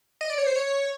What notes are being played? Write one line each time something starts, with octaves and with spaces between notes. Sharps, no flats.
D#5
D5
C#5
C5
C#5